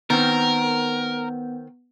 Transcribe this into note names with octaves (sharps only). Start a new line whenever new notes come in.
D#3 B3 C4 A#4